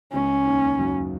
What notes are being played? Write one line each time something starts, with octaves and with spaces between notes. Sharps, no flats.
C#2 C#3 C#4
D#2 D#3
F#2 F#3